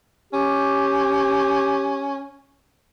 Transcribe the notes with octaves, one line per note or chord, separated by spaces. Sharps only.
C#4 G4